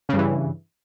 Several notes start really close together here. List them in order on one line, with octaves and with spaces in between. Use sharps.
C#3 G2 E3